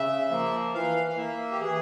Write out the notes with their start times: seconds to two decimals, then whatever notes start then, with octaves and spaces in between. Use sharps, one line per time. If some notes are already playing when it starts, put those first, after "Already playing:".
Already playing: C#3 E5
0.30 F3 A#3
0.74 E3 F5
1.09 F5
1.17 A#3 E5
1.51 G4
1.61 E3 G#4